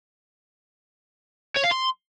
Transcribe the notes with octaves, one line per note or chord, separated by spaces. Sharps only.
C#5
F5
C6